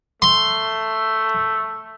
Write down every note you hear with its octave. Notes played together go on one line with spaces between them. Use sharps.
A3 C6